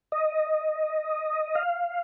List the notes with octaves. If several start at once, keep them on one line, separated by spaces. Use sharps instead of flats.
D#5
F5